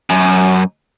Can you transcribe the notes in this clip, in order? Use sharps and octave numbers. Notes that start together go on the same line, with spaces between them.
F#2